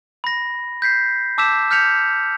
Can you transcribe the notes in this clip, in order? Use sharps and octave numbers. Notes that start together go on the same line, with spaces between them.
B5 A#6
G6 B6 C7
A5 D6 E6 G6 B6 E7
F6 G6 B6 C#7 F7